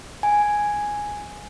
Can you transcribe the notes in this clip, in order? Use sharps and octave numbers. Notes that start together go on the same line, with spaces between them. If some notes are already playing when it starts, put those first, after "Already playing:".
G#5